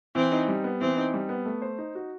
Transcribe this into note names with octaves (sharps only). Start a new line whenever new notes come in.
E3 C4
D#4
G3
B3
E3 C4
D#4
G3
B3
A3
C5
D#4
F#4